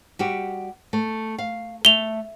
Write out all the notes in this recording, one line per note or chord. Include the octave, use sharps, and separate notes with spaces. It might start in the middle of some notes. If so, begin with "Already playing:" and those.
G3 F#4 G4
A3
F5
A3 F7 G7